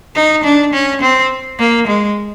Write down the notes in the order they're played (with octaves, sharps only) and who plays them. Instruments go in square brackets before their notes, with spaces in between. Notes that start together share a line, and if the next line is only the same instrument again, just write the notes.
[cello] D#4
D4
C#4
C4
A#3
G#3